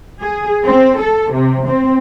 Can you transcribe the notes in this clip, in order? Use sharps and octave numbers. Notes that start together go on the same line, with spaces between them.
G#4
C4
A4
C3
C4